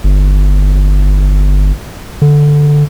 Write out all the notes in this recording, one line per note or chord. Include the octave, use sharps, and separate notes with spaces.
G1
D3